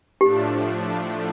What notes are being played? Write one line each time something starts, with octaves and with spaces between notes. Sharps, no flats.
A2 F3 A3 D4 G4